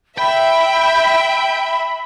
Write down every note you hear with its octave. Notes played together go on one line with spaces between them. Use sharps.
E5 G5 B5